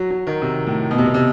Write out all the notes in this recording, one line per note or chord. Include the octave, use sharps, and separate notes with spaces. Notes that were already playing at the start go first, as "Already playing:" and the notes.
Already playing: F#3
F#3
D#3
C3
A2
B2
C3
B2
C3